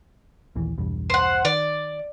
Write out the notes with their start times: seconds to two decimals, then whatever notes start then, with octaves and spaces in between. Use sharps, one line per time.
0.56 A#1 D#2 E3
0.78 B1 E2 G2
1.10 C5 F#5
1.45 D#3 D5